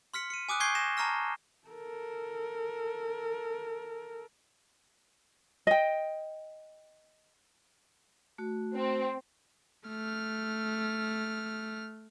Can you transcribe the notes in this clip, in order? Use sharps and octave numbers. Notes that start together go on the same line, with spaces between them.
C6 F6 B6 C#7
C#7 D#7
G#5 D6 D#6 F#6
G#5 C#6 G6 G#6 C7 G7
A#6 E7
A5 A#5 C#6 F6 A#6
A4 A#4
D#5 G5
A3 F#4
C4
A3 F6